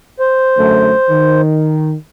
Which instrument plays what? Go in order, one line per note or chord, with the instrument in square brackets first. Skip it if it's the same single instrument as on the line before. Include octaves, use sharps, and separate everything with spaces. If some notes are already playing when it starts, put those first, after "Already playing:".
[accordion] C5
[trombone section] F#2 D3 A3
D#3